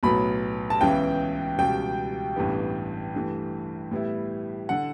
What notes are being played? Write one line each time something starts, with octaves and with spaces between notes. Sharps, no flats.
B1 A2 F#3 B3 B5
A5
C#2 C#3 E3 B3 E4 G5
C#2 B2 G3 G5
A1 G2 E3 B3
G2 E3 A3
A2 G3 B3 E4
D3 F#5